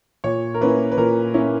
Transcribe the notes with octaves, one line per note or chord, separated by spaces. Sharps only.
A#2 C#5
A#4
A#3 C#4 E4 B4
B4
A#2 A#4
A#3 C#4 E4